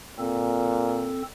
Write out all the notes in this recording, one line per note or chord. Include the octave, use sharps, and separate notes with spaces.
A#2 C4 A4